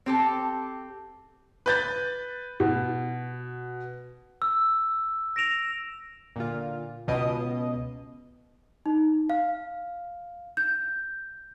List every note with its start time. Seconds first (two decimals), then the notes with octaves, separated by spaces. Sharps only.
0.06 C4 G4 A4
1.66 B4 G6 A6
2.60 B2
4.42 E6
5.36 A#6 D7 E7 F7
6.36 A#2 D3 F4
7.08 C#2 B2 D#5
8.86 D#4
9.30 F5
10.57 G6